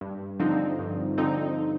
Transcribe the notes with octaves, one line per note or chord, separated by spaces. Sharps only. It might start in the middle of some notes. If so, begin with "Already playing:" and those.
G2
D3 F3 C4 D#4
G2
D3 F3 C4 D#4